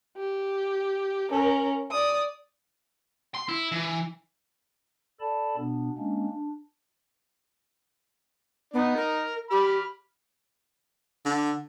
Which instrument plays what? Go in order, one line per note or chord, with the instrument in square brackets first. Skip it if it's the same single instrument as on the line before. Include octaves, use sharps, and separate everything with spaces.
[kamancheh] G4
C#4 A#4
D5 D#6
[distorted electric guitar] C6
E4
E3
[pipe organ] A4 D5 A5 B5
B2 B3 D4
G#3 A#3 C#4 D4
D4
[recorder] B3 [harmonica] D#4 D#5
[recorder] A#4
[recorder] G4 [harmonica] B5 F6
[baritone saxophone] D3